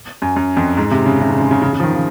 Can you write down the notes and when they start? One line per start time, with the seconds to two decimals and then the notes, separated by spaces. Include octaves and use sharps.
0.22 F#2
0.36 F#2
0.57 F2
0.77 G#2
0.91 C3
1.06 C#3
1.20 C3
1.30 C#3
1.41 C#3
1.51 C#3
1.62 C#3
1.73 C#3
1.80 F3
1.83 D#3
1.93 C#3